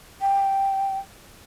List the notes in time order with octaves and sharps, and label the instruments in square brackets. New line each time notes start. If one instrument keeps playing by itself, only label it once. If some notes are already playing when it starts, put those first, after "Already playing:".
[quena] G5